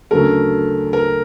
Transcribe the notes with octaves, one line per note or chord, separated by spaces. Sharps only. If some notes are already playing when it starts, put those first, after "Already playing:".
D2 C#3 F#3 A3 A#4
A#4